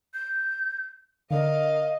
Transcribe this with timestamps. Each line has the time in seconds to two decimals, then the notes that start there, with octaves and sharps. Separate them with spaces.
0.14 G6
1.30 D3 A#4 D#5 F5